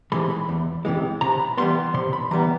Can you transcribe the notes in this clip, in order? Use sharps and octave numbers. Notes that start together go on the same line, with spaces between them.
C3 E3 G#3 B5
B5
E2
C3 E3 G#3
C3 A#5
B5
E3 G3 B3 C6
C3 C6
B5
E3 G3 B3 A#5